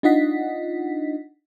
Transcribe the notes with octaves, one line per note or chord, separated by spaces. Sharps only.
D4 D#4 F4 D#5 F#5 B6